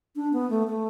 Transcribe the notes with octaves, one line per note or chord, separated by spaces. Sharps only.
D4
B3
A3
A3